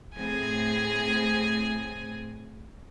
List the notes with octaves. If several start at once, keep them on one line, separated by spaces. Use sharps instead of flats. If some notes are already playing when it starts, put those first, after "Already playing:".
A2 C4 G#4 G#5